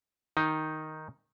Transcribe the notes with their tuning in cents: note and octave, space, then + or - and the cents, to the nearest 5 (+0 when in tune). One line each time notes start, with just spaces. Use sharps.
D#3 +0 D#4 +5